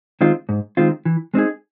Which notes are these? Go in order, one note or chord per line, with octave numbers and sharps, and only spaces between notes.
D#3 G#3 C4 F4
G#2
D#3 G#3 C4 F4
E3
G#3 C4 D#4 G#4